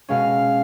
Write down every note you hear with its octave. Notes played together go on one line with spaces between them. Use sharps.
B2 G#3 C#4 F5